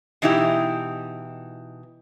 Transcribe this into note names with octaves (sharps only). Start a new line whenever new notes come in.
B2 E3 D#4 E4 G4